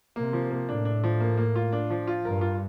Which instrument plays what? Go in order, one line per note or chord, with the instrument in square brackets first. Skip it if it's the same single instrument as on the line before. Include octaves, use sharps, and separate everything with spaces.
[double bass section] C3 [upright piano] A#3
[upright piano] F3
A#3
[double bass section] A2 [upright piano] D4
[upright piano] D4
F3
A#3
A#3
F4
D4
F3
F4
[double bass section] G2 [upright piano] A#4
[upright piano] F4